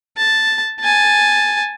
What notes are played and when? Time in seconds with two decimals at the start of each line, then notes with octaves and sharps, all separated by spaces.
0.17 A5
0.81 G#5 A5